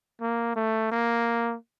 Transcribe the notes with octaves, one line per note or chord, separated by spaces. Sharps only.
A#3
A3
A#3